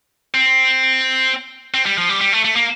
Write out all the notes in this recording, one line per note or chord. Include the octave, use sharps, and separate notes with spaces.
C4
C4
G3
F3
G3
G3
A3
A3
A#3